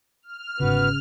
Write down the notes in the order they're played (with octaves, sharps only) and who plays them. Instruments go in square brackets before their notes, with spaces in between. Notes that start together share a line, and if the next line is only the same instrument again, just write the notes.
[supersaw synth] F6
[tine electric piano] G1 G#2 [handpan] C#3 [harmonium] B3 F#4 B4